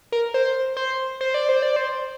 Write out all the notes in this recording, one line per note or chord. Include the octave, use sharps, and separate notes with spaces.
A#4
C5
C5
C5
D5
C5
D5
C5